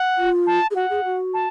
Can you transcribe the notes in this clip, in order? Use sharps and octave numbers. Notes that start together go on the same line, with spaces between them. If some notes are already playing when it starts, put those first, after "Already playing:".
Already playing: F#5
F4
A5
G#4
F#4 F#5
G#4
F#4
A5